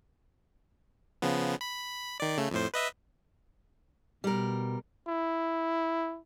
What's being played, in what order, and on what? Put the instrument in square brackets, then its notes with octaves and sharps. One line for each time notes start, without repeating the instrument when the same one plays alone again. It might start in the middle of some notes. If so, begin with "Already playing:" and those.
[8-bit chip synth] C#3 F3 B3
B5
D#3 D5
C#3 A3
F2 A2 C5
B4 D#5 E5
[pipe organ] B2 [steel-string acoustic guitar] G3 A#4
[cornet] E4